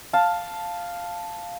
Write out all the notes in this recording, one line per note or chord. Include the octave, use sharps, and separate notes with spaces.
F5 A5